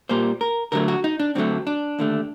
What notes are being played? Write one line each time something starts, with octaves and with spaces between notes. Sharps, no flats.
A#2 G3 A#3 C5
A#4
D2 D3 F#3 A3 A#4
F#4
D#4
D4
D2 D3 F#3 A3 C4
D4
D#2 D3 A3